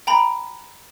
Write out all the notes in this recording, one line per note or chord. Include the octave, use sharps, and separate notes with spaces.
G5 A#5 B5